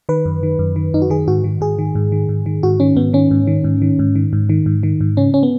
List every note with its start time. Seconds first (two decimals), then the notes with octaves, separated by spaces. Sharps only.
0.09 D#3 B4
0.25 F#2
0.43 D#3
0.59 F#2
0.76 D#3
0.94 F#2 D#4
1.02 F#4
1.10 D#3 G#4
1.28 G#2 F#4
1.44 D#3
1.61 G#2 G#4
1.79 D#3
1.95 G#2
2.12 D#3
2.29 G#2
2.46 D#3
2.63 G#2 F#4
2.80 D#3 C#4
2.96 G#2 B3
3.13 D#3 C#4
3.31 G#2
3.47 D#3
3.64 G#2
3.82 D#3
3.99 G#2
4.15 D#3
4.33 G#2
4.49 D#3
4.66 G#2
4.83 D#3
5.01 G#2
5.17 C#3 C#4
5.34 C#4
5.43 B3